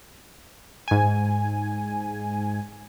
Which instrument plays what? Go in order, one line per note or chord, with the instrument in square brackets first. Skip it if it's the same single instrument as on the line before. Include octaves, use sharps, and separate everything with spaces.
[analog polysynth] G#2 G#5